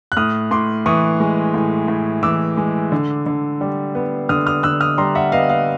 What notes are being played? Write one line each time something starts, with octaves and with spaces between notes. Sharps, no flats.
F#6
A2 D#6 F6
A2 C6 D6
E3 C#6 D#6
G#3
A2
A2
E3 D6 E6
G#3
D3
D3
G3
B3
D3 D#6 F6
D#6 F6
D3 E6 F#6
D#6 F6
G3 A#5 C6
E5 F#5
B3 D#5 F5
D#5 F5